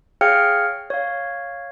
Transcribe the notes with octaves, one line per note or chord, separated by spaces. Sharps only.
G#4 C#5 F5 G5 F6 C#7
C#5 F5